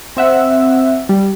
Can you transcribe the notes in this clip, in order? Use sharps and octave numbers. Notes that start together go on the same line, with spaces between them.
C4 E5 F#5
G3